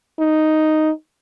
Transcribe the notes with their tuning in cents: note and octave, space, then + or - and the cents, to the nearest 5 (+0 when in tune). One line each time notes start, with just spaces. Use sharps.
D#4 +0